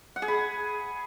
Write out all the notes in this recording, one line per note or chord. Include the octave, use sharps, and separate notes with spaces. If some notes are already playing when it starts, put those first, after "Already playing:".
F#5
G#4
B5